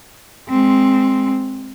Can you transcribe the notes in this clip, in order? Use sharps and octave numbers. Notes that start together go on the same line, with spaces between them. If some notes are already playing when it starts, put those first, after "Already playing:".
G#3 C4